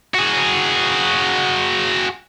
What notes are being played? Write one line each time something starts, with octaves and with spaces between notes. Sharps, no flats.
F#4 G#4